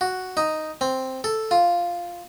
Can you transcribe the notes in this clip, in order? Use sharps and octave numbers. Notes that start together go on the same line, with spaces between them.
F#4
D#4
C4
A4
F4